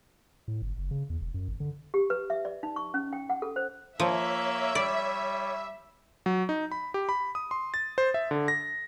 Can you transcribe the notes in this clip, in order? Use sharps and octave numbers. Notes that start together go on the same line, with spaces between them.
A2
G1
F#1
C#3
E2
E1
F#2
G#1
D3
G4
B4
E5
D5
D#4
C#6
C#4
G5
F#5
A4
C5
F3 A#3 C#5 E5
G3 D5
F#3
D#4
B5
G4
B5
D#6
C6
A6
C5
E5
D3
A#6